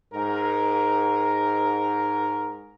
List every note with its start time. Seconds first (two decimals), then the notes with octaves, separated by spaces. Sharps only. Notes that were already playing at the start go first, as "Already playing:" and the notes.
0.11 G#2 A#4